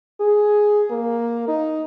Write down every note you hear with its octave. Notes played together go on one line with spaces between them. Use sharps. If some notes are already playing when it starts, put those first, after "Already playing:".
G#4
A#3
D#4